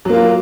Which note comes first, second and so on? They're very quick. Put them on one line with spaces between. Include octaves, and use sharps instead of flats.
F#3 A#3 F4